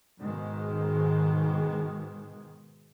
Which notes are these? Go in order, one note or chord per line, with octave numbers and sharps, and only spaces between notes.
G#2 B2 D#3 G#3